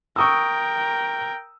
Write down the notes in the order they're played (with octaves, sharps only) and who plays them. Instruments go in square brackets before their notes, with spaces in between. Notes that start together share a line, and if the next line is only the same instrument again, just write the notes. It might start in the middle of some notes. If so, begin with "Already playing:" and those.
[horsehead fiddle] A#4 G5 [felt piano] C#6 D#6 E6